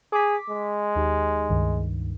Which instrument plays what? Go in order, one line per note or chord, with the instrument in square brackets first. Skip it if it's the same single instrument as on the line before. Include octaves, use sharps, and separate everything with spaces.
[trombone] G#4 [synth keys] D6 B6
[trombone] G#3
[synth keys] D#2 D#4 G4
C#2 G2 D#3